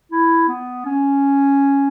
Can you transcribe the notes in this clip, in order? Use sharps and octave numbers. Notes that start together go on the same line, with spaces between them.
E4
B3
C#4